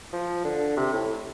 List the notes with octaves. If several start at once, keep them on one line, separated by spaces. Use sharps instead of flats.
F3
D3
C3
A2